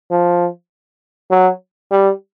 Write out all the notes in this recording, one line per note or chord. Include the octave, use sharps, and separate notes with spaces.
F3
F#3
G3